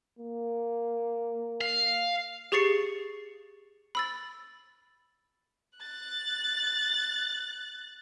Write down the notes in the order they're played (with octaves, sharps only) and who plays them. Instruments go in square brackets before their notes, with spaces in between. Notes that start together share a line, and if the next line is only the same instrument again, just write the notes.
[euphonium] A#3
[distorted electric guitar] F5
[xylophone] G4 G#4 C#6 A6 C7 C#7
B5 E6 A6
[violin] F#6 A6